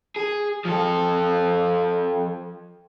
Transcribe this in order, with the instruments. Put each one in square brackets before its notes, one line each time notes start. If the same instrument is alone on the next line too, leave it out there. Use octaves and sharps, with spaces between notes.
[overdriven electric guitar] G#4
F3 A4